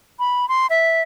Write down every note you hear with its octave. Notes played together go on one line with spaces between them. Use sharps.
B5
C6
E5